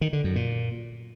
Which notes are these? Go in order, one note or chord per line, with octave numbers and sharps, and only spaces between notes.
D#3
D3
F#2
A#2